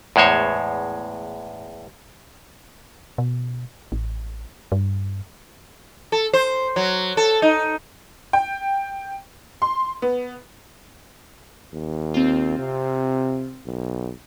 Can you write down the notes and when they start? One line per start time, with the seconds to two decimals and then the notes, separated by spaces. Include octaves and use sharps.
0.16 E2 A2 G#3 C5 C#5
3.18 B2
3.92 A1
4.72 G2
6.12 A4
6.33 C5
6.76 F#3
7.17 A4
7.42 D#4
8.33 G5
9.62 C6
10.02 B3
11.74 D#2
12.14 C4 F4
12.59 C3
13.66 B1